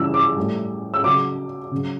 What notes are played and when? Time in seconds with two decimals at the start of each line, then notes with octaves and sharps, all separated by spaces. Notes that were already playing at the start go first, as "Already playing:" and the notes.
Already playing: C#3 E3 G3 E6
0.14 D6
0.37 A2 G3
0.94 E6
1.04 C#3 F#3 D6
1.71 C#3 F#3